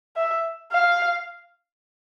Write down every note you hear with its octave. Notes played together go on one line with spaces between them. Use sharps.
E5
F5